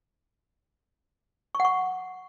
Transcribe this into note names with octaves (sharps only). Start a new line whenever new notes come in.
C#6
F#5
C#6